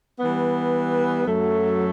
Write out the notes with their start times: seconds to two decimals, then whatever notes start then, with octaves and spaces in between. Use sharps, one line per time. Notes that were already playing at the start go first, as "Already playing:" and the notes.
0.19 E3 G3 B3
1.26 F#2 F#3 A3